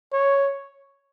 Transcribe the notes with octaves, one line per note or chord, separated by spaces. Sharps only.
C#5